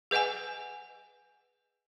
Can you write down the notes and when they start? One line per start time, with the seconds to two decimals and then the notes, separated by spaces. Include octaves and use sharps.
0.11 G#4 B4 D#5 F#5 G#5